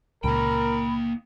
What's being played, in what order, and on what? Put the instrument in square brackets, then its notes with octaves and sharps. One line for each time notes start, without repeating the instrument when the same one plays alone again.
[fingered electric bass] C#2 A#2 C#3 [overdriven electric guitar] A#3 G5 [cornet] A#4 [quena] B5